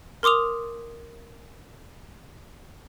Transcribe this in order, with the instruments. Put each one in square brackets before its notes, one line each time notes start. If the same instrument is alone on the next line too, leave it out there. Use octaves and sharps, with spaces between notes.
[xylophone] A#4 C6 D6 D#6 F7